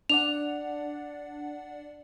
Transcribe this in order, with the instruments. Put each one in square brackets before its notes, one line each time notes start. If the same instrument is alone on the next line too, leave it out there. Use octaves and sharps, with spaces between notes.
[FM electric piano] D4 D5 F#5 [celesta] F7